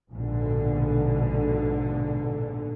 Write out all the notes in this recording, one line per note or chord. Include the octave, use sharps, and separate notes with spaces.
A#1 G#2 B2 D3